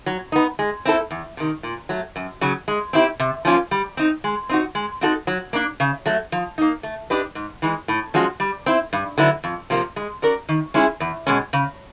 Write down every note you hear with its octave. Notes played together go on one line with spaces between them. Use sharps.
F#3
B3 D#4
G#3
C4 E4 A4
E2
C3 D#3
A#2
F#3 A3
F#2
C#3 F#3
G#3
C4 E4 G4
C3
F3 A#3 C#4 F4
G3
C4 D#4
G#3
C4 D#4 F#4
G#3
C4 D#4 F#4 A4
F#3
A#3 D4
C#3
F#3 A3
F3
A#3 D#4
A3
D4 G4 B4 D#5
G#2
E3 G#3
A2
F3 G#3 C#4 F#4
G3
C4 E4
G2
D3 F#3 B3 E4
F2
C3 F3 A#3
G#3
C#4 F#4 A#4 D5
D#3
G#3 C#4 E4 G#4
E2
B2 G#3 C#4
C#3